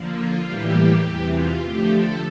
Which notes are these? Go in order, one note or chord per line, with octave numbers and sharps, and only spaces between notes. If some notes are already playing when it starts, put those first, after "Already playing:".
Already playing: D3 F3 A#3
F4
A2 E3 G3 A#3 G4
E2 C3 E3
F4
D3 F3 A3 G4
A4